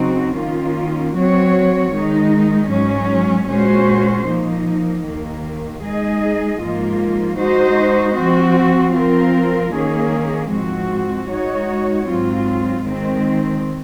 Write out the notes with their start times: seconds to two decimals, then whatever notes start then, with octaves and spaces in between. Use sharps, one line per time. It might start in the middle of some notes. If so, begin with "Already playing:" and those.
Already playing: C#3 F#3 C4 D#4 F#4
0.35 D#3 A#3 C#4 F4
1.13 F#3 C4 F#4 C#5
1.91 D#3 G#3 D#4
2.69 G#2 F#3 C#4
3.47 A#2 G#3 C#4 F#4 C5
4.26 F3 A#3 D#4
5.03 D#2 D#3 A#3
5.82 G#3 D#4 G#4 D#5
6.60 G#2 F3 A#3 F4
7.38 G#3 D#4 F#4 C5 D#5
8.16 F3 C4 F#4
8.94 F3 C4 F4 A#4
9.72 D#3 A#3 C#4 G#4
10.50 G#2 F3 G#3 C4 F#4
11.28 G#3 D#4 F#4 C#5
12.06 G#2 F#3 C4 F4
12.83 D#3 G#3 C4